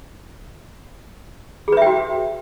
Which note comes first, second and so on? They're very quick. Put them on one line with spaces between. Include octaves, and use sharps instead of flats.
G#4 B4 E5 G5 F#4